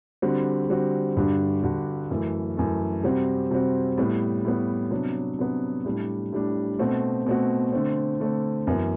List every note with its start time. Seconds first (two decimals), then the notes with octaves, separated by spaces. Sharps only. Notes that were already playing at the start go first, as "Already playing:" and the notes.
0.22 D3 G3 C4 F#4
0.69 D3 G3 C4 F#4
1.17 G2 D3 G3 D4 F#4
1.63 G2 D3 G3 D4 F#4
2.11 F#2 E3 A3
2.57 F#2 E3 A3
3.03 C3 G3 C4 F#4
3.51 C3 G3 C4 F#4
3.98 A2 G3 B3
4.45 A2 G3 B3
4.91 C3 F#3 B3 D4
5.39 C3 F#3 B3 D4
5.85 A2 G3 D4
6.32 A2 G3 D4
6.79 B2 A3 C4 F#4
7.27 B2 A3 C4 F#4
7.72 D3 A3 C4
8.20 D3 A3 C4
8.67 F#2 E3 B3